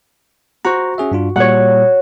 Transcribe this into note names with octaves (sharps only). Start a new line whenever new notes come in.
F#4 C5 A#5
C#4 G#4 E5
G2 D4 F4
A#2 G3 C#5 F#5